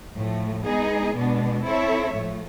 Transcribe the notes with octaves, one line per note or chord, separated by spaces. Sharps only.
A2 F3 A3
G#3 B3 D#4 G#4
B2 G#3 B3 D4
C4 E4 A4 C#5 E5
A2 F3 A3